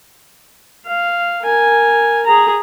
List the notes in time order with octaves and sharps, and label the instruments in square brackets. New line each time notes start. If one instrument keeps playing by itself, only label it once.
[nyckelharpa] F5
A#4 G#5
G#4 A#5